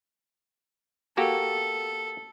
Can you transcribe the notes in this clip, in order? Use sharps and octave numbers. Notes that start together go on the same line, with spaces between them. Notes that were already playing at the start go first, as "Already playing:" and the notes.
A#3 F#4 G4 A4